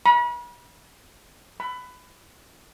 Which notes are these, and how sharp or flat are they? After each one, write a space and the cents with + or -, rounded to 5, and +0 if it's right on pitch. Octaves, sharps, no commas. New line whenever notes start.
B5 -40
B5 +20